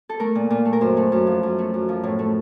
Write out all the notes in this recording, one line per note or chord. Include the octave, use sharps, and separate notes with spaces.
A4
A3 A#4
A#2
A#2
A3
A#4
F#2 C5
A3
F#2
F3
F#2
A3
F#2
F3
A2
A3